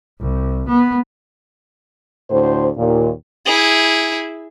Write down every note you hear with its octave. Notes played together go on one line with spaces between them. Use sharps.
C2
B3
D2 A2 C5
D#2 A#2
E4 G#4